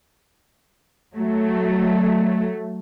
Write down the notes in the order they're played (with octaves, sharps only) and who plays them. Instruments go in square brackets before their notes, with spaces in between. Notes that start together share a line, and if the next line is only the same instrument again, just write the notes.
[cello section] F#3 A3